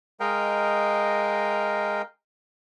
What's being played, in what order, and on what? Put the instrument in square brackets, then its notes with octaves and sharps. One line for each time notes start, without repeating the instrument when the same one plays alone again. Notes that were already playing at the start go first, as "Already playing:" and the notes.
[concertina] G#3 A#4 D#5 F5 G5